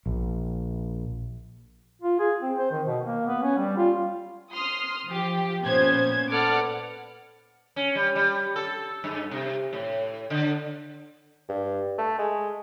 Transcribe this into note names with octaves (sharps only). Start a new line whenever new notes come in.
A#1
F4
G#4
C4
C5
D#3
B2
A#3
B3
C#4
G3
F4
C6 D#6 F6
F3 G4
A#2 B3 C#4 C5 G#6
A4 B4 D5 F#5 D6 F6
C#4
G3
G3
A4
G2
C3
A2
D3
G2
A3
G#3